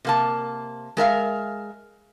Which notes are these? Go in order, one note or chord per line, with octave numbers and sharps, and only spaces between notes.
C3 A#3 A5
G#3 A#4 E5 F5